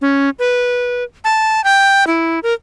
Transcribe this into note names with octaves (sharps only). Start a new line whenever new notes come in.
C#4
B4
A5
G5
E4
A#4